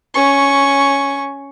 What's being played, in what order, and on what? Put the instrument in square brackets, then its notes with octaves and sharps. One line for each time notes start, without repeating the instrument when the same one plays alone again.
[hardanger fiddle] C#4 C#6